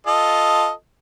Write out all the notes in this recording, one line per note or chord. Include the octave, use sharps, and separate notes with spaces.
F4 A4 D#5